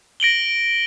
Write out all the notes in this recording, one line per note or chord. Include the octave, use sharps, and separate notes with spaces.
A#6 D7 F#7 G7